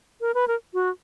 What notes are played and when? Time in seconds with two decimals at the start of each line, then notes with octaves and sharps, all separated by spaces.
0.21 A#4
0.34 B4
0.48 A#4
0.74 F#4